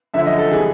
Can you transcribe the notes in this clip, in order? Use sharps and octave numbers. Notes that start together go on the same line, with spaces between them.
F#2 D3 F3 E5
D#5
A4
C#3 E3 G3 G#4